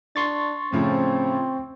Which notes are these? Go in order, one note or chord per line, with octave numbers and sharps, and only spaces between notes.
D4 C6 C#6 A6
A2 C#3 F3 C4